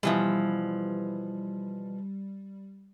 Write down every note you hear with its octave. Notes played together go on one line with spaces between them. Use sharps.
B2 E3 F3 G3